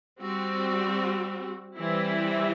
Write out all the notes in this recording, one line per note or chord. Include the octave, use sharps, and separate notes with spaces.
G3 C4 F#4
E3 G3 C4 E4